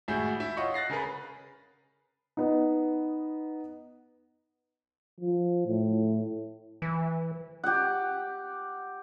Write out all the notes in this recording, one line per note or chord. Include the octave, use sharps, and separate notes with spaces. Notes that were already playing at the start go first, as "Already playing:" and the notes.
G#1 A2 E4 F#4 G#4 G6
E4
F4 C#5 D#5 F#5 C#6
F#6 A6 A#6 C7
C#3 G#4 A#4 B4
B3 D#4
F3
A2
E3
G4 F#5